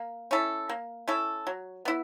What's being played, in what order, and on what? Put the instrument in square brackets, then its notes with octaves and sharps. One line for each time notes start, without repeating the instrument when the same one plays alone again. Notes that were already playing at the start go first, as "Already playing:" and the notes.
Already playing: [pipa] A#3
C#4 E4 A4
A#3
C#4 E4 A4
F#3
B3 E4